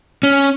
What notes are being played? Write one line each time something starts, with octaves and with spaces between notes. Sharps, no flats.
C#4